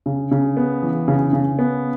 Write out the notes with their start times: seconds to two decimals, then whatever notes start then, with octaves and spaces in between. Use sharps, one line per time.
0.06 C#3
0.31 C#3
0.57 B3
0.83 E3
1.08 C#3
1.33 C#3
1.59 B3